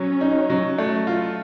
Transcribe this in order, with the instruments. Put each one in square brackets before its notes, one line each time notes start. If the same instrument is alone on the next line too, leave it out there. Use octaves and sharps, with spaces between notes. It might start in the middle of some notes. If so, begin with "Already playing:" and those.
Already playing: [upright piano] F#3 [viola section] C#4
[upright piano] D#4
F#3
A3
F4